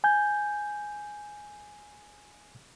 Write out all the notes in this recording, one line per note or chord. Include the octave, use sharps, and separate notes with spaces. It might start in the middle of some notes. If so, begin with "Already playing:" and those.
G#5 G6